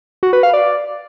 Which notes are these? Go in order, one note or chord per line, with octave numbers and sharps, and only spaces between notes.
F#4
B4
F5
D5